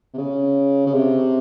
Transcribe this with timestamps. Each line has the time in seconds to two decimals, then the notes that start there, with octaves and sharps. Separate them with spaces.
0.14 C3
0.18 C#3
0.87 C#3
0.94 C3